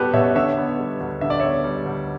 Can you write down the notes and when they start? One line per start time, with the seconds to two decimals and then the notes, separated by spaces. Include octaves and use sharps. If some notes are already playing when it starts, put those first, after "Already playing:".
Already playing: B2 G3 B3 F#4 G4 A4 B4
0.13 B2 C#5 E5
0.35 D3 C#5 E5
0.58 B3
0.78 G3
1.00 D2
1.21 D3 E5
1.30 D5
1.40 B3 C#5 E5
1.64 G3
1.86 D2